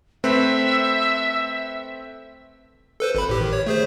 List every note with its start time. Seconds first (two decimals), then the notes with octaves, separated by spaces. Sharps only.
0.24 A3 C4 B4 E5
3.00 A4 B4 C5
3.15 G#1 B4 B5
3.29 A2 G4
3.41 D#3
3.53 C#5
3.66 A3 G#4 C5